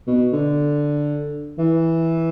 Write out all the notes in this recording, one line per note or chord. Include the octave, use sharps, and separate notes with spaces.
B2
D3
E3